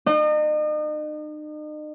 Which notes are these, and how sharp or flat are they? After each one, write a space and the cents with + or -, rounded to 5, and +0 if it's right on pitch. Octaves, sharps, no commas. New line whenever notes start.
D#4 -40